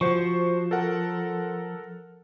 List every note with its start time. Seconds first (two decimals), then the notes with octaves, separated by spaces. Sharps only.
0.01 F3 F#4 C5 C#6
0.71 A4 A#4 F#5